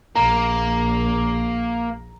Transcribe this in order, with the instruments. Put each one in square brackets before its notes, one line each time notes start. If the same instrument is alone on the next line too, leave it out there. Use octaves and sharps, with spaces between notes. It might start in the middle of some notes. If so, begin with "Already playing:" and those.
[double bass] A#1 [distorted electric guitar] A#3 [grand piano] A#5